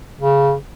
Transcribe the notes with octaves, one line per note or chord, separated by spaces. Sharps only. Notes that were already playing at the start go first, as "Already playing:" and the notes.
C#3